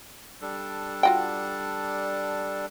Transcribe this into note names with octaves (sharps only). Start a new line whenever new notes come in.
G3 D4 A4
F4 F#4 G5